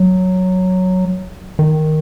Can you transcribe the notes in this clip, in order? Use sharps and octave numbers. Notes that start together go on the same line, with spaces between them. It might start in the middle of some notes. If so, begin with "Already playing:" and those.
Already playing: F#3
D#3